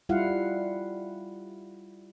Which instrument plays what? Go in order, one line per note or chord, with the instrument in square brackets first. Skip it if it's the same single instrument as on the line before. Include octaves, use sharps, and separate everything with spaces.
[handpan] G3 E4 F4 F5 F#5